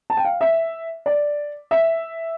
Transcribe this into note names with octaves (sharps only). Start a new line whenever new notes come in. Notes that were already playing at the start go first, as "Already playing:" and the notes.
A5
G5
F5
E5
D5
E5